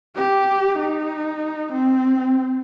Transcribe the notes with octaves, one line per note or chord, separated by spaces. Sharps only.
G4
D#4
C4